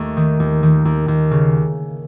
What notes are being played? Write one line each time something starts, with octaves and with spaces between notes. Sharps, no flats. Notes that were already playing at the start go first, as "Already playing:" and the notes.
Already playing: D#2 A3
D#3
D#2
D#3
D#2
D#2
C#3